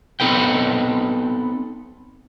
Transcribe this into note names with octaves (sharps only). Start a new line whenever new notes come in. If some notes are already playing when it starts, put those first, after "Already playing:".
B3 C4 D#4 A4 B4 G5